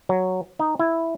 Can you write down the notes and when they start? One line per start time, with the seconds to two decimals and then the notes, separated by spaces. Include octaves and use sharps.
0.09 F#3
0.59 D#4
0.79 E4